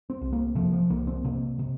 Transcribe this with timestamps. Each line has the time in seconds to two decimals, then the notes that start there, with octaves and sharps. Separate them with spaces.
0.10 C4
0.21 C2
0.33 A#3
0.55 C3 F3
0.73 F3
0.90 C2 A#3
1.07 C4
1.25 C3 A#3
1.59 C3